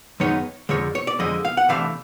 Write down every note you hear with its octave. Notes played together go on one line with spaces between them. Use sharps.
F#2 D#3 G#3 B3 D#4 C#5
F2 D3 F3 G#3 C#5
C#5
D5
F2 D3 F3 G#3 D#5
F5
F#5
C3 E3 A3 D4 F5